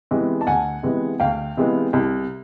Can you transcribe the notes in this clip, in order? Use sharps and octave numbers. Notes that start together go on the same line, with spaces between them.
C3 E3 G#3 B3
A5
D2 F#5 G#5
C3 E3 G#3 B3
D2 F5 G5
C3 E3 G#3 B3
C2